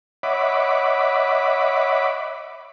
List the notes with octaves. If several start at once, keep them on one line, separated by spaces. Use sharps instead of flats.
C#5 D#5 E5 F#5 B5 D6